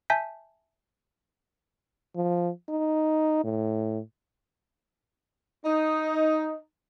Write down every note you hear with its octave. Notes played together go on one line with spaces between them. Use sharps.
E5 G#5 A5 G6 B6
F3
D#4
A2
D#4